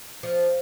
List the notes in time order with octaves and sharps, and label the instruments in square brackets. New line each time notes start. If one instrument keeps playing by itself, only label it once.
[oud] F3